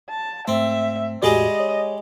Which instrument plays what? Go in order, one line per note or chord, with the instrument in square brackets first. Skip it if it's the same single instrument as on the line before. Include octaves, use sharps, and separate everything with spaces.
[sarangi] A5
[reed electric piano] G#2 A3 [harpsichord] C4 [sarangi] E5
[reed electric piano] E2 A2 F#4 [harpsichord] G3 G#3 G#4 [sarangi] D#5
[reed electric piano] C#5